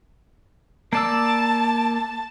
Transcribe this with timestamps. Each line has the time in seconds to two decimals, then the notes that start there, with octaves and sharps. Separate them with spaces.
0.93 A#3 D5 A5 E6